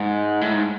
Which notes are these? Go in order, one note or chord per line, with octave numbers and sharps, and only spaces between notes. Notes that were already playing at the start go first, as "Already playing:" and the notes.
Already playing: G#2
A2
G#2